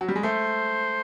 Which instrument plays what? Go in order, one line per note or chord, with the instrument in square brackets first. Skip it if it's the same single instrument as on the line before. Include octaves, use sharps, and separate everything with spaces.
[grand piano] F#3
G3
G#3
[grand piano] A3 [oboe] C5